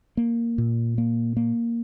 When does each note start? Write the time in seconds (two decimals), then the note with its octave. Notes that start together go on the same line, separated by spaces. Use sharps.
0.17 A#3
0.58 A#2
0.98 A#3
1.37 A#3